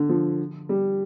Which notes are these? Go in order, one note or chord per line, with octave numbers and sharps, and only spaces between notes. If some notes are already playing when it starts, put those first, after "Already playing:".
Already playing: D3
F3
G3